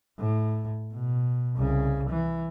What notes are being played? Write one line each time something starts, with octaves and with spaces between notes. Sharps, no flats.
A2
B2
C2 C#3
E3